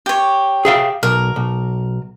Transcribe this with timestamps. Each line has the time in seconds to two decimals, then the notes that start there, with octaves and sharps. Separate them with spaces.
0.06 G4 C#5
0.65 G#4 E5 F5
1.03 B1 A#4
1.36 B1